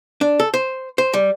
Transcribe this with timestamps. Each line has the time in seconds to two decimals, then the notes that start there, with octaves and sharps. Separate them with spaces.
0.21 D4
0.40 A4
0.54 C5
0.98 C5
1.13 G3